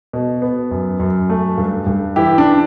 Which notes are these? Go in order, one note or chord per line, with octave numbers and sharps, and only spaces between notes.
B2
B3
F#2
F#2
A3
G2
G2
E3 E4 G4
D4